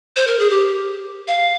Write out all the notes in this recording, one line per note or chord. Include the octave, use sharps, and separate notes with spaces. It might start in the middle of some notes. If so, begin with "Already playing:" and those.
C5
A#4
G#4
G4
F5